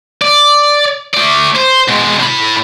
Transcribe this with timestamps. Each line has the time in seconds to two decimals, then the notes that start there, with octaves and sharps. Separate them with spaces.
0.22 D5
1.14 A3 D5
1.56 C5
1.89 B2 G#3
2.20 A2 B5